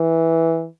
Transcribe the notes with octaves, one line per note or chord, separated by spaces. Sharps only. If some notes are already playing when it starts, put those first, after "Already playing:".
Already playing: E3